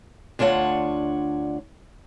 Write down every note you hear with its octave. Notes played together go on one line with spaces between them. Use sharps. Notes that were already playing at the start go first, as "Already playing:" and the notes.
D2 D4 F4 C#5 F#5